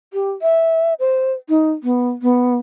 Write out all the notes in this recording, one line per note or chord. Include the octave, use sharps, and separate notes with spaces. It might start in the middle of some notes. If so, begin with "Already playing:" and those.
G4
E5
C5
D#4
B3
B3